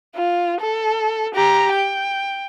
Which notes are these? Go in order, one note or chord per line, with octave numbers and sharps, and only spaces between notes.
F4
A4
G4 A#5
G5